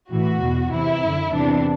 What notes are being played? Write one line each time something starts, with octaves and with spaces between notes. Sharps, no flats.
A2 E3 F#4
E2 B2
E2 C3 E3 E4
F#2 D3
E2 C3 E3 D4